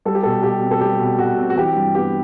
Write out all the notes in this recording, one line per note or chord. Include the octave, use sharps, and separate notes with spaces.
G3 A4
G4
B2 A4
B2 G4
C4
A4
G3 G4
B2
B2 F#4
C4
F#4
E3 G4
G2
B3 G4